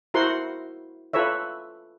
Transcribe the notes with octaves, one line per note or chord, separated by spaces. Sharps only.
E4 F#4 A#4 C5 F#5 C6
F4 A4 B4 C#5 E5